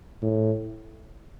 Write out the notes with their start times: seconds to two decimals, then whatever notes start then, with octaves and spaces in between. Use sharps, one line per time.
0.22 A2